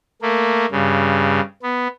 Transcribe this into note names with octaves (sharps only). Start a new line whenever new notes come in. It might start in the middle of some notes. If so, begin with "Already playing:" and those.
A3 A#3
G2 C#3
B3